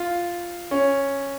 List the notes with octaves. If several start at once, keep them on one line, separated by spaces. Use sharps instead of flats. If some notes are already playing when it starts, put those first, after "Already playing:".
Already playing: F4
C#4